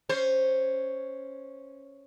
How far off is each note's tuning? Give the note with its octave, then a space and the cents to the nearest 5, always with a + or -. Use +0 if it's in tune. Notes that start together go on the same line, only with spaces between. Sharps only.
C#4 +0 C5 +0